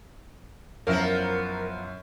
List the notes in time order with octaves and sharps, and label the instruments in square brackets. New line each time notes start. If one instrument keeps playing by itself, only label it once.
[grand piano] F#2 E4 [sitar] F3 B3 [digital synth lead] A#4